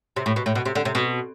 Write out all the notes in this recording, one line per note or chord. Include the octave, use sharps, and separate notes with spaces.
C3
A2
B2
A2
B2
C3
D3
C3
B2